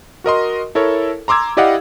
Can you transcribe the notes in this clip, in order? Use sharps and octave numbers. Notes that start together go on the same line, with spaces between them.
F#4 A#4 D#5 C6
E4 A4 A#4 C#5
A#5 C6 D6 E6 G#6
E4 G4 D5 D#5 F5 F#5